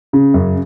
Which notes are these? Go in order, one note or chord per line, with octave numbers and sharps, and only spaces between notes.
C#3
F#2